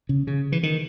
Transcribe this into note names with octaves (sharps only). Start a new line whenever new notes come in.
C#3
C#3
E3
D#3